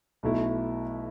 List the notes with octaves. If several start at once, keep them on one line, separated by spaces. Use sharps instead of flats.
B1 B2 A3 E4